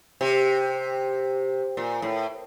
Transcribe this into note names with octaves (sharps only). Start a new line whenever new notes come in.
C3
A#2
A2